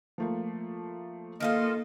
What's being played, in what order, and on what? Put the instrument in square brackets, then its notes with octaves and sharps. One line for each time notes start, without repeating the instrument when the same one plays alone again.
[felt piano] F3 A3 A#3
[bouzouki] D#3 F4 C5 [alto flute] A#3 [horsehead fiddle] A4 D#5